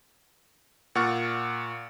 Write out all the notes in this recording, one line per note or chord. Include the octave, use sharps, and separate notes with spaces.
A#2 F#5 C#6 F6 A6